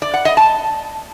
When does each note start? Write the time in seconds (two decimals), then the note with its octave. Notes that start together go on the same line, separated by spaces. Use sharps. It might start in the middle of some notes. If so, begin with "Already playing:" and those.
0.02 D5
0.14 F#5
0.25 D#5
0.37 A5